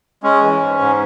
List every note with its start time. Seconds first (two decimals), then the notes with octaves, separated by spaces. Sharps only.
0.23 G#3 C#4
0.42 E3
0.60 G#2
0.80 G#2